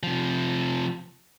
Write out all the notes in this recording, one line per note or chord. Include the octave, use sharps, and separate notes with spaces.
C3 F3